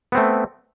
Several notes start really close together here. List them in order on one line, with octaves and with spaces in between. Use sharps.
B3 C4 A3